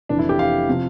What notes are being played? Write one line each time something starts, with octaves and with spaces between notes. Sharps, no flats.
F1 F2 E3 D4
E4
G4
F5
C3 F3